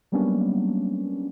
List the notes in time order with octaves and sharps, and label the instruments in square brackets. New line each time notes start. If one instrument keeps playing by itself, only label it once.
[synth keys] F#3 G3 A#3 B3 C#4 D4